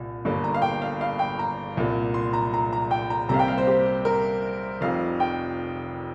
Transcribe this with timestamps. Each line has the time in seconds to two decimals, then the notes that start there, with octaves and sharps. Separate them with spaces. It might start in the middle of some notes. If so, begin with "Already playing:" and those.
Already playing: C2 A#2
0.25 G1 G2 G3 A#3
0.44 A#5
0.54 F5
0.62 G5
0.82 F5
1.01 F5
1.19 G5
1.39 A#5
1.77 C2 A#2 A#3
2.14 C6
2.33 A#5
2.54 A#5
2.73 A#5
2.91 G5
3.10 A#5
3.29 C2 C3 G3 A#3 F5 A#5
3.39 G5
3.48 F5
3.58 C5
3.67 G4
4.05 A#4
4.81 F1 F2 C3 F5
5.20 G5